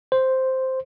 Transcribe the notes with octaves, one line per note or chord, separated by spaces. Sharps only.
C5